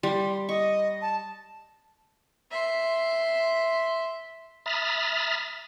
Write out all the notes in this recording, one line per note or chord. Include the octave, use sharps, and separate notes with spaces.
G3 C6
D#5 C#6
A5
E5 C6
E5 A#5 B5 D#6 F6 A6